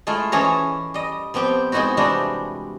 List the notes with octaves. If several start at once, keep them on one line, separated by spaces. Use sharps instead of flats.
G#3 A3 E4 F4
E3 C#4 G#4 A4 A#5
G3 D#5
F3 B3 C4 G4
G#3 B3 C4 D#4 E4 F#4
C3 E3 G3 G#3 D4 F#4